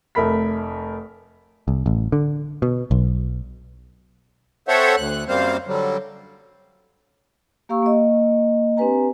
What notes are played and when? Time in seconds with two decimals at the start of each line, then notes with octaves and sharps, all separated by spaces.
0.15 F1 A3 A#4 B5 B6
1.68 C2
1.86 A1
2.12 D3
2.62 B2
2.91 B1
4.68 C4 A4 C5 C#5 E5 F#5
4.97 D2 F#6
5.28 F#2 G3 A#3 C4 C5 F5
5.67 D3 F#3 G3
7.69 A#3 G4 F5 A#5 C#6 E6
7.83 A#3 D#5
8.77 C4 D4 G4 B4 G#5 A#5